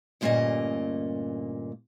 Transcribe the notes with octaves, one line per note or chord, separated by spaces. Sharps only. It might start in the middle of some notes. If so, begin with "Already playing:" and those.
D2 G2 A#2 A#3 C#4 D#5